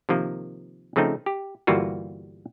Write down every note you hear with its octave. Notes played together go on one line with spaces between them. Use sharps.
C3 D#3 F3 A#3
C#3 F3 A3 C4 D#4
G4
G1 E3 G3 A#3 F4 F#4